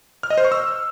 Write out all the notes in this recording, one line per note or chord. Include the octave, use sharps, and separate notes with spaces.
F6
D#5
C5
C#6
E6